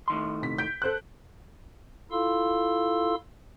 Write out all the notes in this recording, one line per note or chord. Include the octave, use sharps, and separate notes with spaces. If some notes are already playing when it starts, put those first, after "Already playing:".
A2 D#3 C6
C3 B6
G6 B6 D7
A4 C5 F#6
E4 F4 A4 F5 C6 E6